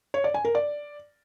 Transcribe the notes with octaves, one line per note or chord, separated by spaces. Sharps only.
C#5
D5
G#5
A#4
D5